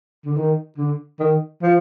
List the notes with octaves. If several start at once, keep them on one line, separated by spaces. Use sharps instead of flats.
D3
D#3
D3
D#3
F3